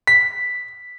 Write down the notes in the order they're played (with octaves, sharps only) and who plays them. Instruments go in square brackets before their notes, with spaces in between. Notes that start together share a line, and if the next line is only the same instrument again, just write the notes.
[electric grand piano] B6